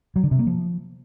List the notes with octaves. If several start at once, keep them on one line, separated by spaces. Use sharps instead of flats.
F#3
D3
C3
A#3
F3